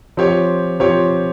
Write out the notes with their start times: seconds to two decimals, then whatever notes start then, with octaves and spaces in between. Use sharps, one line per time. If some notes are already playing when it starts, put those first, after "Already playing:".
0.17 F3 C4 G4 C#5
0.80 F3 C4 G4 C#5